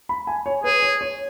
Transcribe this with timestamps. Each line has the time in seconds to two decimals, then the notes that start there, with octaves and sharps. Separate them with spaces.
0.09 B5
0.27 G#5
0.46 C#5
0.64 G#4 B4
0.82 C#5
1.01 C#5